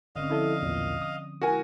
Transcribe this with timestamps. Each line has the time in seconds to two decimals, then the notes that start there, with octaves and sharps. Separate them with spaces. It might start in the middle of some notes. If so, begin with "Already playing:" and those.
0.16 G#1 D3 C4 C#4 D#5 F5
0.30 F3 E4 A4 D5
0.62 B1 E2 A#2
1.02 D#6
1.41 G#3 E4 F#4 A#4 F#5 G#5